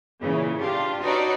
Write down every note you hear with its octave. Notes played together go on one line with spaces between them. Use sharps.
A#2 C#3 E3
D4 F4 G4
D4 D#4 F#4 B4 C#5 D5